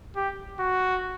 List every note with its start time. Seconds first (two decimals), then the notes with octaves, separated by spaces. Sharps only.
0.16 G4
0.60 F#4